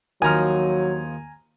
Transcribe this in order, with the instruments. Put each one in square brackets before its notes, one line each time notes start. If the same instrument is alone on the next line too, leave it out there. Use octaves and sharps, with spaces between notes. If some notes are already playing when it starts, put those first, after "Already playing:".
[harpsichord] D#2 F3 [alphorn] F#3 [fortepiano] G#5 A#5 F6